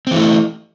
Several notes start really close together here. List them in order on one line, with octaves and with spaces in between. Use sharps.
C4 E3 A3